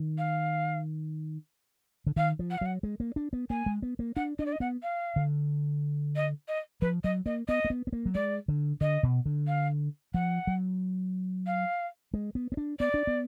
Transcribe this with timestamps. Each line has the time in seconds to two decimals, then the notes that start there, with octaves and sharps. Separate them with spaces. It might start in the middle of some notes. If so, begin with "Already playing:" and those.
Already playing: D#3
0.18 F5
2.07 D3
2.16 D#3 F5
2.39 F3
2.51 F#5
2.58 F5
2.61 F#3 F#5
2.83 G#3
3.00 A#3
3.16 D4
3.33 B3
3.50 A#3 G#5
3.66 G#3
3.82 B3
3.99 A#3
4.16 D4 F#5
4.39 D4 D#5
4.46 D5
4.52 D#5
4.60 B3 F#5
4.83 F5
5.16 D3
6.16 D#5
6.48 D#5
6.81 F3 B4
7.04 F#3 D#5
7.26 A#3 D#5
7.48 B3 D#5
7.65 A#3
7.70 B3
7.87 B3
7.93 A#3
8.06 F#3
8.15 G#3 D5
8.48 D3
8.81 D3 D#5
9.03 B2
9.26 D3
9.47 F5
10.14 F3 F#5
10.47 F#3
11.47 F5
12.14 G#3
12.35 B3
12.52 B3
12.57 D4
12.79 B3 D5
12.94 D4
13.07 B3